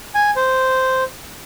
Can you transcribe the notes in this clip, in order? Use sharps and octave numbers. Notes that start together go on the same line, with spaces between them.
G#5
C5